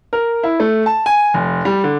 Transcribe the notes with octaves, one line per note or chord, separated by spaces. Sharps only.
A#4
E4
A3
A5
G#5
F1
G3
D3